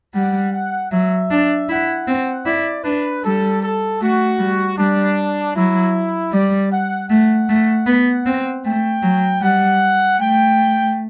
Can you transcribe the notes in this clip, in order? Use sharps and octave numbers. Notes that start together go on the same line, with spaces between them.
G3 F#5
F#5
F#3 E5
D4
E4 F#5
C4
E4 D5
D4 B4
G3 A4
A4
A3 F#4
G3
G3 D4
F#3 E4
G3 D5
F#5
A3 F#5
A3
B3
C4
A3 G5
F#3
G3 F#5
A3 G5